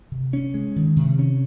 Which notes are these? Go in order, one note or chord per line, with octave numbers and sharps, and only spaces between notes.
C3
C#4
G#3
D#3
C3
C#4